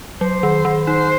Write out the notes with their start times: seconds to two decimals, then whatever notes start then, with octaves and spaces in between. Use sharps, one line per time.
0.21 F#3 C5
0.43 D#3
0.65 D#3
0.87 D#4 C5